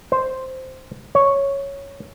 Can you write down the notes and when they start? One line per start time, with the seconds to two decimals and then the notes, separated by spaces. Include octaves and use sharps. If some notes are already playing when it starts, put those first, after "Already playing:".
0.12 C5
1.15 C#5